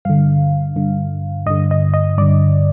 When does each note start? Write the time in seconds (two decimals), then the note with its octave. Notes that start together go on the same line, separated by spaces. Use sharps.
0.05 G2 D3 F5
0.76 G2 D3
1.46 G2 D3 D#5
1.71 D#5
1.94 D#5
2.18 G2 D3 D5